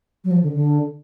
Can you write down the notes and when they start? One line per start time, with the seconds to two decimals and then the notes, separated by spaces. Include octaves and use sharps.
0.24 F#3
0.31 F3
0.43 D3
0.53 D3